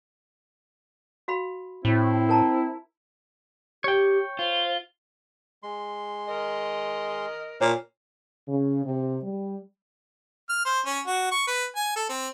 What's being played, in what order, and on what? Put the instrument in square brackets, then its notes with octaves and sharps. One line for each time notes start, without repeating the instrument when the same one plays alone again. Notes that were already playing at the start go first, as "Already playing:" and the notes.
[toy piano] F#4 F5 B5
[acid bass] A2 [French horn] C4 [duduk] E4
[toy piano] A#4 A5 A#5
[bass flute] G4 [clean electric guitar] C#5 G5
[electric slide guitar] F4 [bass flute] C5
[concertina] G#3 C6
[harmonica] A#4 D#5
[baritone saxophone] A#2 [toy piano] C#5
[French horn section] C#3
C3
G3
[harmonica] F6
C5
C#4
F#4
C#6
B4
G#5
A4
C4